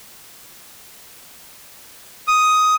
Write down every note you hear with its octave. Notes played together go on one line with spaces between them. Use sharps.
D#6